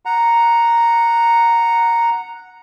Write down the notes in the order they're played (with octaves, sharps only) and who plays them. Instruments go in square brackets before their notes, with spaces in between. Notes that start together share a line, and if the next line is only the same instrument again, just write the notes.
[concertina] F#5 A#5